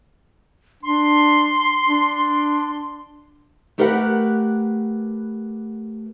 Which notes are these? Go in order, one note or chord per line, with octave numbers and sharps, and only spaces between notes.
D4 C6
D4
A3 G4 A#4 B4 E5 F#5